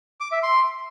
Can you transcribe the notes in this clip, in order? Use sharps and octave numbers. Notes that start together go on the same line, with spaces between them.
D6
E5
C6